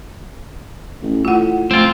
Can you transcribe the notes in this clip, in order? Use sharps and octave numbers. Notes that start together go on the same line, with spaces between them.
A1
A2 F4 F#5
F2 A3 C4 F4